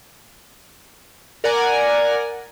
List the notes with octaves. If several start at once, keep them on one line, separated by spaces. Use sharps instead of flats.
A#4 D5 F#5 G#5 A#5